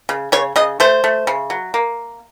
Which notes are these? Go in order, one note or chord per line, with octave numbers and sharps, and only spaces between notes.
C#3
C#3 C#5
C#3 D#5
A3 C5
A3
C#3
F#3
A#3